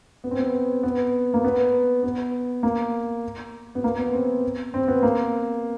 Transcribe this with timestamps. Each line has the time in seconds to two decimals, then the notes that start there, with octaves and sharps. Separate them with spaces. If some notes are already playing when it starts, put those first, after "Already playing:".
0.24 B3
0.31 C4
0.39 B3
0.83 B3
1.34 A#3
1.44 B3
2.03 B3
2.63 A#3
3.75 B3
3.84 A#3
3.98 B3
4.14 C4
4.74 C4
4.88 B3
5.03 A#3